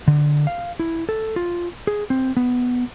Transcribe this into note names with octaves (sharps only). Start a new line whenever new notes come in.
D3
F5
E4
A4
F4
G#4
C4
B3